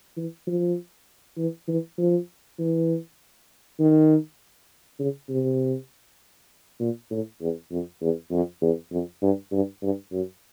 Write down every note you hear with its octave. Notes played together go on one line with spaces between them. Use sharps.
E3
F3
E3
E3
F3
E3
D#3
C#3
C3
A#2
A2
E2
F2
E2
F2
E2
F2
G2
G2
G2
F#2